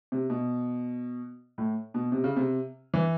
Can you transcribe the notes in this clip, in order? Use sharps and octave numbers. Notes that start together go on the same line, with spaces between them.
C3
B2
A2
B2
C3
C#3
C3
E3